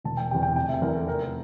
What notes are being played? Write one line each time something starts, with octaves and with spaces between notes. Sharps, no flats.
E1 A5
G5
E2 C3 G5
G5
F1 G5
E5
E2 E3 A#4
A4
F1 A#4